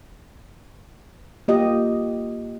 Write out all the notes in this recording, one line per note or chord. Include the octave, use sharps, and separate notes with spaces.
A#3 F4 G4 D#5